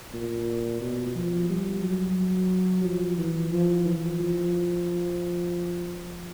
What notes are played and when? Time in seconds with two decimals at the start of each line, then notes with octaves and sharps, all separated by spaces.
0.13 A#2
0.81 B2
1.15 F3
1.49 G3
1.83 F#3
2.84 F3
3.18 E3
3.52 F3
3.86 E3
4.20 F3